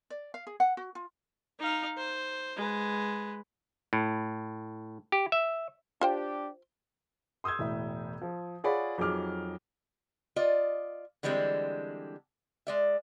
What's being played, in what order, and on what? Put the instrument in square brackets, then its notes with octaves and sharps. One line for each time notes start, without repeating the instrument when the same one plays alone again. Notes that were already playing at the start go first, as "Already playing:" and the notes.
[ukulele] D5
F5
G#4
F#5
F#4
F4
[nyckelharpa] D#4 F5
C5
G#3 B4
[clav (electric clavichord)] A2
G4
E5
[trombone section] D4 G4 [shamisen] F4 C5 G5
[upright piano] C6 D#6 E6 G6 G#6
E1 A2 E5
F3
F4 G#4 C#5 D5 F#5 B5
F2 F#3 D#4 G#4 D6 F6
[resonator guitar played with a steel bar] F4 D5 D#5
D3 E3 G3 G#3 C4 D4
G#3 D5 E5